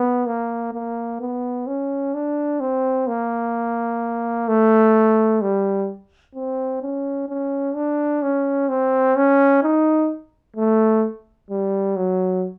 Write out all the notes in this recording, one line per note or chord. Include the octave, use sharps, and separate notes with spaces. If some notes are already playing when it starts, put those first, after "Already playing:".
Already playing: B3
A#3
A#3
B3
C#4
D4
C4
A#3
A3
G3
C4
C#4
C#4
D4
C#4
C4
C#4
D#4
A3
G3
F#3